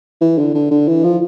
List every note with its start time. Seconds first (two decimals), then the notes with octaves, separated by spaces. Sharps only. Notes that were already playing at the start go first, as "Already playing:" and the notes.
0.21 E3
0.38 D3
0.54 D3
0.71 D3
0.88 E3
1.04 F3